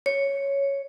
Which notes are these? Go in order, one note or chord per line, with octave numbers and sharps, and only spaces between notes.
C#5